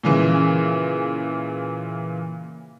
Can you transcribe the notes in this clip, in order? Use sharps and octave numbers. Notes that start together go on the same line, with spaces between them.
A#2 C#3 E3